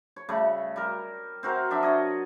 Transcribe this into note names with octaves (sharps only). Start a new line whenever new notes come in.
C#5
C#3 G3 A3
G3 A#4
C4 F#4 A#4 C5
F#3 D4 E5
D4 C#5 D#5